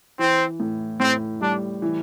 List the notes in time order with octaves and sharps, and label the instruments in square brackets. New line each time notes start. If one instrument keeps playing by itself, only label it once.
[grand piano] E3 [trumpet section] C4
[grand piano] A2
[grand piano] A2 [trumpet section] C4
[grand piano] G3 [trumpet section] D4
[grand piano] E3